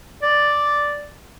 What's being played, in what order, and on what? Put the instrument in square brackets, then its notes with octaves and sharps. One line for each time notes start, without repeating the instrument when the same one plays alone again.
[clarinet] D5